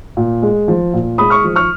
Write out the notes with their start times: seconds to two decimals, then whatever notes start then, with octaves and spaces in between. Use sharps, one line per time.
0.17 A#2
0.42 G#3
0.68 F3
0.94 A#2
1.18 G#3 B5 D#6
1.30 C#6 F6
1.44 F3
1.56 C#6 F6